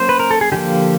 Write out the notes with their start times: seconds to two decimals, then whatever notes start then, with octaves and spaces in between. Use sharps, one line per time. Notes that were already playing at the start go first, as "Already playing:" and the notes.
Already playing: F#3 A#3 C#4 C5
0.09 B4
0.20 A#4
0.31 A4
0.41 G#4
0.52 D3 F3 A#3 G4